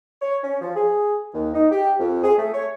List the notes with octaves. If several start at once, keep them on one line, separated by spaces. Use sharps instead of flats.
C#5
C#4
F3
G#4
D#2
D#4
G4
F2
G#4
A3
C#5